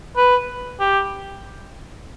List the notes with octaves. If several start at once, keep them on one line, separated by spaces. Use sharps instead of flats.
B4
G4